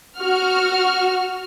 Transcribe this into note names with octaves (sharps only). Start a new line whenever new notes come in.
F#4 F6